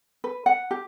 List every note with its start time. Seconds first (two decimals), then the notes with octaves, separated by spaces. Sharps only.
0.24 B4
0.46 F#5
0.71 G4